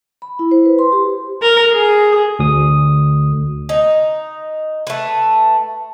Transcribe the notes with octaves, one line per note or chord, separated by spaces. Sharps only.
B5
E4
C5
B4
C6
G4
A#4
G#4
D2 D#6
D#4
A3 B4